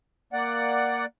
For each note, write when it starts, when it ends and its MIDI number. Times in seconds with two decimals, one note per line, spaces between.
0.33 1.06 58
0.33 1.06 74
0.33 1.06 78